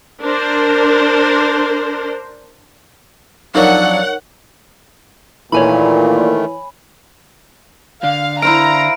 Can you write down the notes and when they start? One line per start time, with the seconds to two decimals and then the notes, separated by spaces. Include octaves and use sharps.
0.22 D4 A#4 C5
3.55 F2 F#3 D4 D#4 A#4 C#5 F#5
5.52 A#2 D#3 E3 A3 C#5 G#5 B5
8.04 D3 F5
8.42 E4 C5 F5 A#5 D7